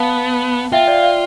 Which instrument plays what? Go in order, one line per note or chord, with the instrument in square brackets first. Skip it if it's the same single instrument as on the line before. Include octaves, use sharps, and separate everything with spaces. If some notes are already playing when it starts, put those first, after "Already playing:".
Already playing: [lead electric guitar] B3 [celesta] F5 A5
[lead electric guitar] F4 [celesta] E5 G5
[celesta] D5 F5
D5 F5